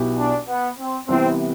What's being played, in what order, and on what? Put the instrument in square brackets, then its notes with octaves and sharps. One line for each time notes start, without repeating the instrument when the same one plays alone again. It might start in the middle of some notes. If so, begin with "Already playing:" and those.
Already playing: [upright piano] B1 B2 B3 E4 G4
[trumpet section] D4
B3
C4
[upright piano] C2 C3 E3 B3 E4 [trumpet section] C4